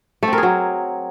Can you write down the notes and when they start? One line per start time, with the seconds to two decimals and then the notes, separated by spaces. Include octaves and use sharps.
0.23 A3
0.28 C4
0.33 A#4
0.38 G#4
0.43 F#3